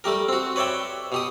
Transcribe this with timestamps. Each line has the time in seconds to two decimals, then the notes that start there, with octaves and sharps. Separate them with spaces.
0.04 G3 A3 G4 A#4
0.29 C4 F#4
0.56 B4 C#5 D5 E5 G5
1.12 B2 G4 D#6